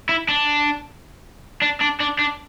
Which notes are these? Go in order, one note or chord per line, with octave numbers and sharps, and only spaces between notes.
E4
D4
D4
D4
D4
D4